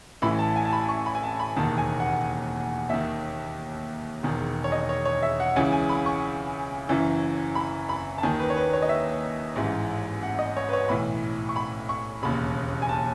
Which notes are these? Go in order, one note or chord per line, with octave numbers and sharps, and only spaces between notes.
A1 A2 E3 B5
A5
G#5
A5
B5
C#6
B5
G#5
A5
B5
E1 D#2 D#3 A5
G#5
F#5
D#2 D#3 E5
E1 E2 D#3
C#5
D#5
C#5
C#5
E5
F#5
C#2 C#3 E3 G#5
G#5
B5
C#6
F#1 F#2 E3
B5
B5
A5
D#2 D#3 G#5
B4
C#5
B4
C#5
D#5
E5
A1 G#2 E3
F#5
D#5
C#5
B4
C#5
B1 A2 E3 B5
C#6
B5
C#6
E1 D#2 C#3 B5
G#5
A5